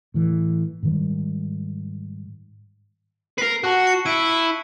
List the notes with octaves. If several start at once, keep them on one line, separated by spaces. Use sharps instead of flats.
A2 E3
G#2 D#3 G3
A#4 B4 C7
F#4 A5 C#6 F#6
C#7
E4 B6 D7 D#7